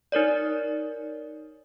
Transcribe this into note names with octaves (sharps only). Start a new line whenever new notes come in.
D#4 A#4 C#5 D5